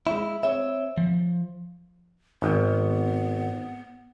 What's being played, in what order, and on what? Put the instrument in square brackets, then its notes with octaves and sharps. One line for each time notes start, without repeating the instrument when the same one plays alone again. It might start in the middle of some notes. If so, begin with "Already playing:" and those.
[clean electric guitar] G#3 E4
C4 C#5 E5
F3
[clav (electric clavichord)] G#1 [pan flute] B3